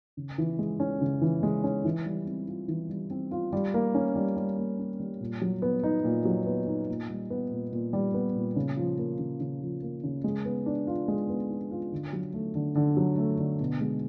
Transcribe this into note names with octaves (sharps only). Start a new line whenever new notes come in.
C#3
E3
G#3
C#4
C#3
E3
G#3
C#4
E3
G3
C4
F4
E3
G3
C4
F4
G3
A#3
C#4
G3
G3
A#3
C#4
G3
A#2
F#3
B3
D#4
A#2
F#3
B3
D#4
A#2
G3
B3
A#2
A#2
G3
B3
A#2
C#3
F3
A#3
C#3
C#3
F3
A#3
C#3
G#3
B3
D4
F4
G#3
B3
D4
F4
D3
F#3
A3
D3
D3
F#3
A3
D3
B2
G#3